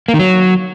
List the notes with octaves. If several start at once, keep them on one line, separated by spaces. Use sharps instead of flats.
A#3
D#3
F#3